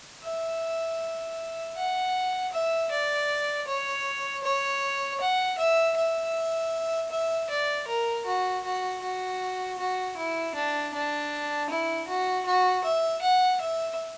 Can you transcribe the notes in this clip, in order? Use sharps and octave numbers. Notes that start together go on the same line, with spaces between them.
E5
F#5
E5
D5
C#5
C#5
F#5
E5
E5
E5
D5
A#4
F#4
F#4
F#4
F#4
E4
D4
D4
E4
F#4
F#4
E5
F#5
E5